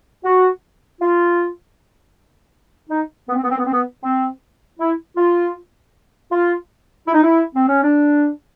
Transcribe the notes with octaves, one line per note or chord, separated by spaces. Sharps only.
F#4
F4
D#4
B3
C4
B3
C4
B3
C4
B3
C4
E4
F4
F4
E4
D#4
E4
C4
C#4
D4